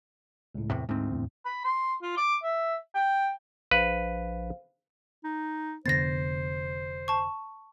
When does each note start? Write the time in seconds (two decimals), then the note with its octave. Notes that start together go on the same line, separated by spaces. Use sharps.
0.55 C#2 A2
0.70 E2 A2 C3 G5
0.89 D2 G#2 C4
1.11 E2 A2
1.45 B5
1.64 C6
2.02 F4
2.17 D6
2.43 E5
2.95 G5
3.71 A#1 B4 C5 F5
5.24 D#4
5.86 F1 D3 B3 C5 A6 A#6
7.08 A5 C#6